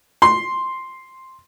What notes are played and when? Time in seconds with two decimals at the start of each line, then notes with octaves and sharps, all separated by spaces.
0.22 C6